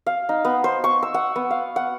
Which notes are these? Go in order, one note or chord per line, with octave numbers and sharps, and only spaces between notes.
F5
D#4
B3
C5
C#6
E6
F#5
B3
F5
F#5